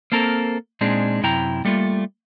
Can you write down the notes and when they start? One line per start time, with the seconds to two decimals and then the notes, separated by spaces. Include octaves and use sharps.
0.12 A#3 C4 A4 A#4
0.81 A#2 G#3 C4 D4 D#4 G#4
1.23 F#2 C3 E4 G5 A#5
1.65 G3 A3 A#3 F4